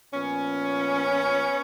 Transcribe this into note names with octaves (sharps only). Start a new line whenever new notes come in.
A#2 F3 B3 C#4